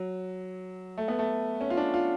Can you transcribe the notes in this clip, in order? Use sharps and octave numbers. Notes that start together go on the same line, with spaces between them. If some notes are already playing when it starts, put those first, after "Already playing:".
Already playing: F#3
A3
B3
A3
C#4
F4
D4
F4